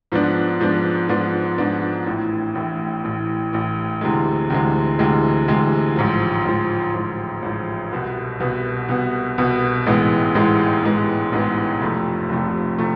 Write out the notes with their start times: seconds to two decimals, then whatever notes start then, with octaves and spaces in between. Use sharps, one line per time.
0.12 G#2 F3 B3 D4
0.60 G#2 F3 B3 D4
1.09 G#2 F3 B3 D4
1.58 G#2 F3 B3 D4
2.07 A1 A2 E3
2.55 A1 A2 E3
3.04 A1 A2 E3
3.53 A1 A2 E3
4.01 D2 C3 E3 G#3
4.50 D2 C3 E3 G#3
4.99 D2 C3 E3 G#3
5.48 D2 C3 E3 G#3
5.96 A1 G#2 F3
6.45 A1 G#2 F3
6.93 A1 G#2 F3
7.42 A1 G#2 F3
7.91 C2 B2 B3
8.40 C2 B2 B3
8.89 C2 B2 B3
9.38 C2 B2 B3
9.86 A1 G#2 E3 G#3 B3
10.35 A1 G#2 E3 G#3 B3
10.83 A1 G#2 E3 G#3 B3
11.32 A1 G#2 E3 G#3 B3
11.80 F1 F2 C3 F3 A3
12.29 F1 F2 C3 F3 A3
12.78 C3 F3 A3